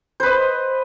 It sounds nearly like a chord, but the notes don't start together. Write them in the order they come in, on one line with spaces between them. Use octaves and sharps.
C5 B4 D#5